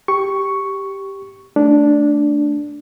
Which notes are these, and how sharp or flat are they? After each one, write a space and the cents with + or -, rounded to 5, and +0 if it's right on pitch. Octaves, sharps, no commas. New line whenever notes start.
G4 +0 C#6 +0
A3 +0 D4 -5